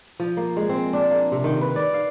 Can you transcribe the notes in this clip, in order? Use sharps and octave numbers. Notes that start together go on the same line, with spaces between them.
F3
A#3
G#3
C4
D4
A#3
C3
D#3
B4
D5
F5